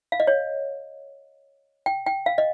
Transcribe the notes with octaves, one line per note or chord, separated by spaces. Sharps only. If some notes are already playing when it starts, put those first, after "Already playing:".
F5
D#5
C#5
G5
G5
F5
D#5